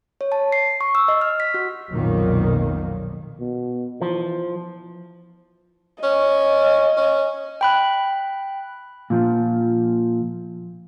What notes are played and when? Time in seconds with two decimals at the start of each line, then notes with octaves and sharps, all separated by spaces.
0.21 C#5
0.32 A5
0.52 C7
0.81 C#6
0.95 E6
1.08 D#5
1.21 F6
1.40 B6
1.54 F#4
1.91 B1 F2 A#2 D#3 A#3
3.40 B2
4.01 E3 F3
6.04 C#4 D#5
6.97 C#4
7.61 G5 B5 F#6
9.10 A#2 F3